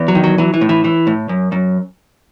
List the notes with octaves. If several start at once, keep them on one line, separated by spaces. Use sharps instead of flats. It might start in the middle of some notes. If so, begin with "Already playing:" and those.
Already playing: E2
F#3
D#3
F#3
E3 F#3
E3
A2
E3
E3
A2
F#2
F#2